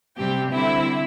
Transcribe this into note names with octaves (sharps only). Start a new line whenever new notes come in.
C3 G3 C4 G4 G5
D3 G3 C4 E4 E5